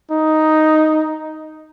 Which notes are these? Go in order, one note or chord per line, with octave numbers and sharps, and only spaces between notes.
D#4